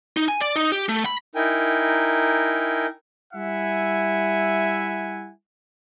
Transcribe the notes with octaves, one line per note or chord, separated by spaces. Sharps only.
D#4
G#5
D5
D#4
G4
A3
B5
D#4 E4 A#4 G5 G#5
G3 E4 E5 F#5 G#5